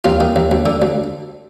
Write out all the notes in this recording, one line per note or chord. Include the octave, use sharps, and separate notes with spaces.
D#2 F4
D#3
D#2
D2
D3
D2